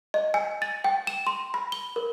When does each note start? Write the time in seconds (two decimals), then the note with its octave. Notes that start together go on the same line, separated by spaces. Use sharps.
0.14 D#5
0.34 G#5
0.62 A6
0.84 G5
1.07 E7
1.27 C6
1.54 B5
1.72 G7
1.96 A#4